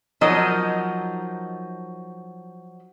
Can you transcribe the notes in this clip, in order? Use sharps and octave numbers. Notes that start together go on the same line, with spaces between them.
F3 F#3 D#4 A#4 D#5